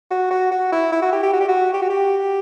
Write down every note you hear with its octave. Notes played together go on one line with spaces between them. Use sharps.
F#4
F#4
F#4
E4
E4
F#4
G4
G4
F#4
G4
F#4
G4
F#4
G4